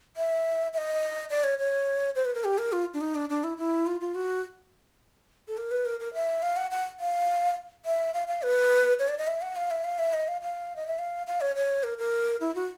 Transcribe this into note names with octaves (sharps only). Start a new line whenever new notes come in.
E5
E5
D#5
D5
C#5
C#5
C5
B4
A#4
G4
A#4
F4
D4
D#4
D4
D4
E4
E4
F4
F4
F#4
A4
A#4
B4
A#4
A#4
E5
F5
F#5
F#5
F5
E5
F5
F5
B4
C#5
D5
D#5
E5
F#5
F5
E5
F5
E5
D#5
F5
F5
D#5
E5
F5
F5
C#5
C#5
A#4
A#4
E4
F#4